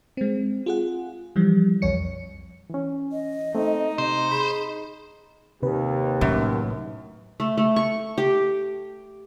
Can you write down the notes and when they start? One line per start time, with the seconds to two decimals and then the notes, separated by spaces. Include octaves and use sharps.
0.17 G#3 C4
0.66 F4 G#4 F#5
1.36 E3 F3 G3
1.82 B1 F2 C#5 C#7
2.70 E3 C#4
3.12 D#5
3.55 A3 C4 D#4
3.98 C3 C5
4.31 G#4 B5
5.63 D#2 C3 B4
6.21 F#2 A2
7.40 A3
7.57 A3
7.76 C#6
8.18 G4